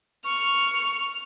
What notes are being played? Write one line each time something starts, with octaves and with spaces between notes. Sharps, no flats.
C#6 F6